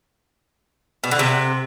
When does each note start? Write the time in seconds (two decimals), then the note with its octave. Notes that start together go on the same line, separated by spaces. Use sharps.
1.04 B2
1.11 D3
1.19 C3